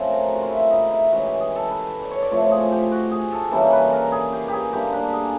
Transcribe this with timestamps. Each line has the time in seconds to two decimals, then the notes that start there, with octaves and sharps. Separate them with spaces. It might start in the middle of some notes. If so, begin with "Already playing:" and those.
Already playing: C#3 F3 A3 C4 F4
0.10 A#4
0.27 G4
0.34 F#4
0.42 F4
0.50 E4
0.70 D#4
0.91 E4
1.10 E3 G#3 C#4 F#4
1.26 G4
1.40 G#4
1.55 A4
1.71 B4
2.02 D5
2.11 C#5
2.22 D5
2.31 A2 F3 A3 C4 C#5
2.51 G#4
2.72 G4
2.91 F#4
3.11 G#4
3.32 A4
3.52 E3 G3 A#3 C#4 A4
3.72 B4
3.92 A#4
4.12 G#4
4.33 G4
4.48 G4 G#4
4.73 D3 G3 A#3 G4
4.92 D4
5.13 G#4